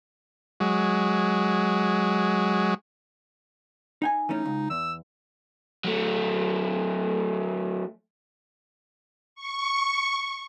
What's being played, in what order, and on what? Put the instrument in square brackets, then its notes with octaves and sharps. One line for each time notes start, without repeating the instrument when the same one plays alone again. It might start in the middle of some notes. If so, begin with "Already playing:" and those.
[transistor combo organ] F#3 G#3
[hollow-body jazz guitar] D#4 G5 G#5
[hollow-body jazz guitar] E3 A3 C#4 [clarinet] D#4
[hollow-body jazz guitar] C#2
[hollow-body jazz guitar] E2 [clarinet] E6
[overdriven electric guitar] F#3 A3
[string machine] C#6